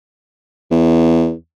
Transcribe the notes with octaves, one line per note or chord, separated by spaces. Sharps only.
E2